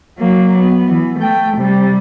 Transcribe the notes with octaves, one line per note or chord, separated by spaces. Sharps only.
F#3 A#3
B3
E3
A3 G5
C3 G3